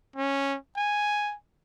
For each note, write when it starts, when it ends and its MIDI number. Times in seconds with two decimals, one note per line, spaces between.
0.16 0.56 61
0.76 1.34 80